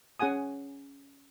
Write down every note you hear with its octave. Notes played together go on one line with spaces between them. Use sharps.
C#4 G#4 F#5 G#5 D#6